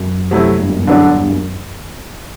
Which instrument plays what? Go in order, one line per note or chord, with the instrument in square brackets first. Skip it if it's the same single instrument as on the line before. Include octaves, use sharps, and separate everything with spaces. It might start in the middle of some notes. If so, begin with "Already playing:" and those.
Already playing: [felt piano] F#2
[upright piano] C3 F#3 A3 E4
[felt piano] G2
F#2
E2 G2
[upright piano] D3 F#3 B3 D4
[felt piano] E2 G2
F#2